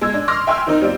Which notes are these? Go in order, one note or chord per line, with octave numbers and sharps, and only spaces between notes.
G#3 E6 G#6
D4
C6 D6 E6 F6 A#6
E5 G5 G#5 C6 E6 F6
D#3 C4 D#4
G3 C4 F4 D5